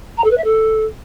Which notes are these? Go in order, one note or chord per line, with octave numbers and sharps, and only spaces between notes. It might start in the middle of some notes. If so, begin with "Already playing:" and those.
A#5
A4
B4
E5
A4